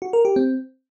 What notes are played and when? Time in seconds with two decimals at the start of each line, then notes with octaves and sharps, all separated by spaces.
0.02 F#4
0.13 A#4
0.25 G4
0.36 C4